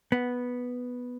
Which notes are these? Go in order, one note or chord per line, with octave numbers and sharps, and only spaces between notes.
B3